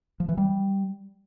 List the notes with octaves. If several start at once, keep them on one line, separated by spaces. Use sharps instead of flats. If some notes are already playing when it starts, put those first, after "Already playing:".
F3
E3
G3